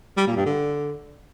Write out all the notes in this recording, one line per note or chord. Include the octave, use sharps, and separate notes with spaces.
G3
A#2
G2
D3